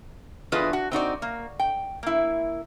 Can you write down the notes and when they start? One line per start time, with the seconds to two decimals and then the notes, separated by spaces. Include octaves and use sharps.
0.52 E2 D4 F4 G#4 B4 D#5
0.73 F#4
0.92 C4 D#4 F#4 D5
1.22 A#3
1.60 G5
2.03 A#3 E4